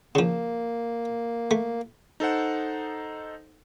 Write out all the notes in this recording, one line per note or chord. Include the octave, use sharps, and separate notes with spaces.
C#3 F3 A#3
A3
D#4 A4 C5 F#5